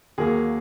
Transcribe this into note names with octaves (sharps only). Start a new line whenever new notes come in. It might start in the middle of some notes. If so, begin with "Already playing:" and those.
D#2 D#3 F#3 A#3 G#4